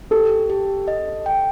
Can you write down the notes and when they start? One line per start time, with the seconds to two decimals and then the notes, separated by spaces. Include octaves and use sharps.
0.11 G4 A4
0.50 G4
0.88 D#5
1.26 G5